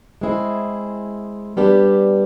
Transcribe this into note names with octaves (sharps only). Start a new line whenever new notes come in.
G#3 C4 E4 G#4
G3 B3 D4 G4